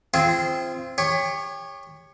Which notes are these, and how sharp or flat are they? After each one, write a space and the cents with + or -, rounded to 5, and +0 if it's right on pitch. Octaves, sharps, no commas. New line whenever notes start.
C4 +0 F4 -30 G#4 +0
G4 +35 C#5 +0